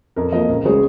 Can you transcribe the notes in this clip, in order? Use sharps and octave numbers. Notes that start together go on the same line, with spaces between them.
F2 A#4
F3 A#3 A#4 D#5
C#2 A#4
C#3 G#3 G#4 C#5